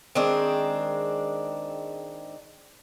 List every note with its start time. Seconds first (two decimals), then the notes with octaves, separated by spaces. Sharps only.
0.15 D#3 G#3 C4 D4